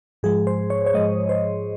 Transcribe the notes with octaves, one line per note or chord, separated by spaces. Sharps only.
G#2 F3 G#3 G#4
C5
C#5
C#5
G#2 F3 G#3 D#5
C5